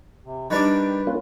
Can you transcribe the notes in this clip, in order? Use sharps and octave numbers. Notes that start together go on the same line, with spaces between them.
C3
D#3 G3 D4 B4
A#3 C#4 F4